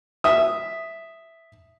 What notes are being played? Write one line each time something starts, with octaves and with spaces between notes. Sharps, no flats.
E5 D#6